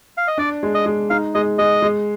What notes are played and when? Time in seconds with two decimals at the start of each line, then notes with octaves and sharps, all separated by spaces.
0.17 F5
0.28 D#5
0.38 D4 D5
0.63 G#3
0.74 D#5
0.86 G#3
1.10 D#4 F5
1.34 G#3 D#5
1.58 G#3 D#5
1.82 G#3